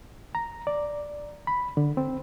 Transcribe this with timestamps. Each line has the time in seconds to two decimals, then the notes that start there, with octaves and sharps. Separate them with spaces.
0.35 A#5
0.67 D5
1.47 B5
1.77 D3
1.97 C4